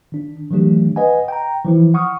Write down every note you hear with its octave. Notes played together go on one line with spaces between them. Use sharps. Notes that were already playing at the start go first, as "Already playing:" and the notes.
D#3 D4
D#3 E3 F#3 A3 D4 G4
B4 D#5 F#5 G#5
G5 A#5
E3 F3 E4
F#5 C#6 D#6 F6